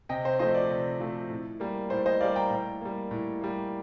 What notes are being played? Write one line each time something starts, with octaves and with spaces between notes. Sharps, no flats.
C3 D#5 G5
C5
F3 A3 C5 D#5
D5
C3
F3 A3
A2
G3 A#3
A2 C5
C5 D#5
G3 A#3 D5 F5
G5 A#5
A2
G3 A#3
A2
G3 A#3